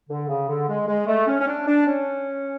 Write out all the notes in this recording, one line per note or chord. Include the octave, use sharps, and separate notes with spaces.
D3
C#3
D3
G#3
G#3
A3
C#4
C#4
D4
D4
C#4